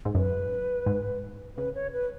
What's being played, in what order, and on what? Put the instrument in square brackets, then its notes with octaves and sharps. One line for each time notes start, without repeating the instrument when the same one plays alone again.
[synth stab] G#2
[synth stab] F#2 [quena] B4
[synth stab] G#2
[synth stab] C#3 [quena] B4
[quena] C#5
B4